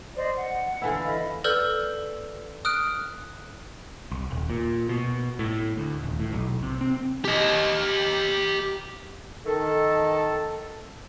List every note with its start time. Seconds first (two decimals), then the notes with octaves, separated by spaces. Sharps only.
0.15 C5 D5 D#5
0.35 F#5
0.82 D3 E3 E4 F5
1.04 D#5 F5 B5
1.44 A4 B4 D5 E6 F6 G6
2.65 D#6 F6 F#6 D7
4.12 C2
4.30 D#1
4.50 A#2
4.89 B2
5.39 A2
5.77 D2
6.04 D#1
6.20 A2
6.33 B1
6.63 C3
6.81 C4
7.25 G4 D#5
9.45 D#3 A4